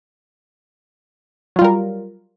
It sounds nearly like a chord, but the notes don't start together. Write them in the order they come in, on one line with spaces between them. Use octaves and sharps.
F#3 F4 G3 A#4